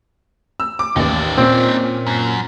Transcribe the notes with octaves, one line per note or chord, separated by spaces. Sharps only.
E6
D6
A1 D#2 D#4 D5
A#2 C4 C#4
F#2